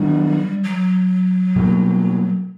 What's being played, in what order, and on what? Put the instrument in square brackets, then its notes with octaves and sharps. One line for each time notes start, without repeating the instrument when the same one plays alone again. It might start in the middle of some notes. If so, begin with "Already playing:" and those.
Already playing: [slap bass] D#3 F#3 B3 D4 [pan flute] G3
[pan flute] F#3
[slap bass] B2 G3 A#3